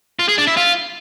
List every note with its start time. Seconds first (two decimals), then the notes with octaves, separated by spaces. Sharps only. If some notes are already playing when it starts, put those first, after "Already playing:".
0.19 F4
0.29 G#4
0.38 D4
0.48 E4
0.57 F4